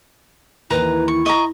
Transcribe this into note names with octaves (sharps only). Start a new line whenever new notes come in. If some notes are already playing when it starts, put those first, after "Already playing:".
D#2 E3 E4 B4 A#5
C#6
D#5 A#5 C#6